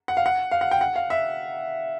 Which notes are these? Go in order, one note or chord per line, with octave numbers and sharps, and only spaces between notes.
F#5
F5
F#5
F5
F#5
G5
F#5
F5
E5